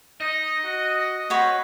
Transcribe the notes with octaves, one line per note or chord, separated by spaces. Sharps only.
D#4 D#5
F#4
C4 F#4 B4 C#5